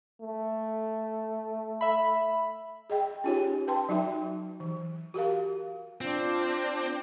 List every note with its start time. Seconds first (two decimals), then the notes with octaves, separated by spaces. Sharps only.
0.21 A3
1.81 E5 B5
2.90 G#4 D#5 G5
3.24 C#4 D#4 F4 G4 C#5
3.68 B4 G5 A5 C6
3.89 F#3 D#4 F#4 E5
4.60 E3
5.14 F#4 G4 A#4 F5
6.01 C4 D4 F4